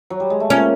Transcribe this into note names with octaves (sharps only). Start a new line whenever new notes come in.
F#3
G3
G#3
A3
A#2 A#3 C#4